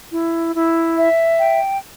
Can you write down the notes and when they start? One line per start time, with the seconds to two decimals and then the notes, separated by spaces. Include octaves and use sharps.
0.11 E4
0.54 E4
0.97 E5
1.39 G5